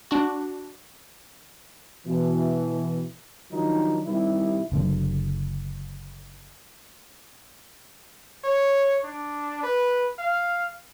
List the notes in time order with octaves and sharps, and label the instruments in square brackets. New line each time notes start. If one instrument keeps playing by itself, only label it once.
[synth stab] D4 F#4
[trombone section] B2 E3
D#3 F3 F#3 D4 D#4
C3 D#3 G3 E4
[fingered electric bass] F#1 D3 F#3
[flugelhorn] C#5
D4
B4
F5